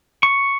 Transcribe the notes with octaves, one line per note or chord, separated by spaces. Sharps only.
C#6